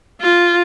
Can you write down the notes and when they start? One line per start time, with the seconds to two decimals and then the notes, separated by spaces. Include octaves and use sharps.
0.21 F4